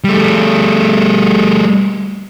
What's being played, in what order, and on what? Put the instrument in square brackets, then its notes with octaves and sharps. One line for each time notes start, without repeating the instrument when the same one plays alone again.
[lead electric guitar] G3 A3